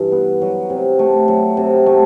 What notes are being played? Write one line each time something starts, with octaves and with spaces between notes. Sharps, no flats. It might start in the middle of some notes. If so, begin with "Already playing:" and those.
Already playing: G2 E3
B3
F#3
C3
A3
F#3
C3
A3